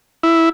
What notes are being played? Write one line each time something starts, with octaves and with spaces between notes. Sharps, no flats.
E4